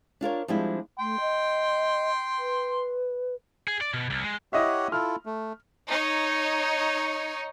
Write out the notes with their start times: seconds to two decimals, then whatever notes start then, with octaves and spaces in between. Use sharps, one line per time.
0.21 D4 F4 A#4 C#5
0.48 F3 G3 G#3 C4 D4 E4
0.99 A3 G5 C6
1.20 D#5
2.38 B4
3.68 G#4
3.81 D5
3.94 B2
4.10 C2
4.24 G#3
4.53 E4 G4 C#5 D#5 E5 F#5
4.92 E4 F4 A4 F6
5.26 A3
5.88 D#4 C#5